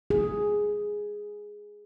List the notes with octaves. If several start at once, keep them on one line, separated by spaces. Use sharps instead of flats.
G#4